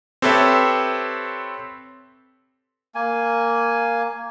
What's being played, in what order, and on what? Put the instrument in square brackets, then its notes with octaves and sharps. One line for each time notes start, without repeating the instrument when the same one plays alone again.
[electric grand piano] C4 G4 A4 B4 C#5 E5
[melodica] A#3 G#5